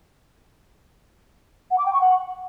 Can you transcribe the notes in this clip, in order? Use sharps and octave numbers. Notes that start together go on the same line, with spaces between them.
F#5
D6
G5
C#6
F#5